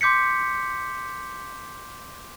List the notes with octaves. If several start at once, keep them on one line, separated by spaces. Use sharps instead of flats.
C6 D6 G6 B6 C#7